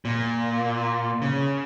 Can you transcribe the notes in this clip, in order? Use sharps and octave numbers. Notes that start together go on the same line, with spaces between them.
A#2
C#3